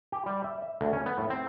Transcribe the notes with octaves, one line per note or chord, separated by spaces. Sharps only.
G4
G3
E5
E5
D2
C#4
B3
A2
C4